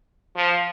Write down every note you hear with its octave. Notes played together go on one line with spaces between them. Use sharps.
F3